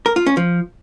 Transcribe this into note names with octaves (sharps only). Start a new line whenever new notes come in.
A#4
F4
C#4
F3